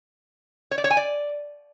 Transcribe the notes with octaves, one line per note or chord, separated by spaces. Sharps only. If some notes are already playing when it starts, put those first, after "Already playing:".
C#5
D5
C#5
G#5
D5